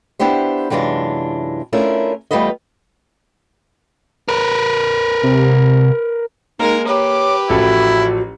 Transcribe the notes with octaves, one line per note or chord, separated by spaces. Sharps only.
B3 D4 E4 G4 C5
F#2 C3 E3 G#3 D4 F4
A3 C#4 D4 E4 F4 A#4
E2 G3 A3 F4 B4 D#5
A#4 B4
C3
G#3 A#3 D#4 A#4
G4 B4 C#5 D6
A1 F3 E4 F#4 A4